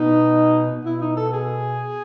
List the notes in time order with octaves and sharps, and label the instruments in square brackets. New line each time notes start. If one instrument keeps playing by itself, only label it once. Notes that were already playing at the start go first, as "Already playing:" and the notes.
Already playing: [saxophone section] B2 D#4
B2
E4
D#4
A4
G#4